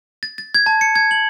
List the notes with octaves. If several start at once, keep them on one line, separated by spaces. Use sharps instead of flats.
A6
A6
G#6
A5
C#7
G#6
F#7